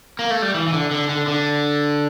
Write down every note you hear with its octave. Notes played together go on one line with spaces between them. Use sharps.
A#3
A3
G3
E3
E3
D3
D3
D3
D3